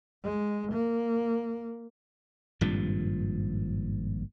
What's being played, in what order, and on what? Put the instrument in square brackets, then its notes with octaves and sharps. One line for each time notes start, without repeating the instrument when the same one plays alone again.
[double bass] G#3
A#3
[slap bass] G#1 G2 A#2 F3